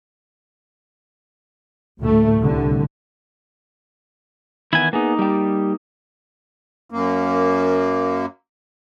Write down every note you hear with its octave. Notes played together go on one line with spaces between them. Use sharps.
D2 A2 A3
C2 A2 D3
D#3 E3 B3 E4 G#5
A#3 B3 D#4 G#4
G3 G4
F#2 A#3